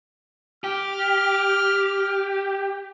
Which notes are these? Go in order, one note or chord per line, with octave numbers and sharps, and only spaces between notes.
G4 F6